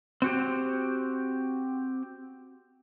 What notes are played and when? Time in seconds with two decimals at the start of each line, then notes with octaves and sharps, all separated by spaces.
0.22 C4 F#4 G4